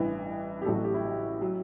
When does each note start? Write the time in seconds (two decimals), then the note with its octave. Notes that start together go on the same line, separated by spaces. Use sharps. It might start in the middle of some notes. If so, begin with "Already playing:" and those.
Already playing: A1 G2 E3 B4
0.62 G4
0.65 A1 A2 F#3 A4
0.74 F#4
0.84 G4
0.94 E4
1.41 F#3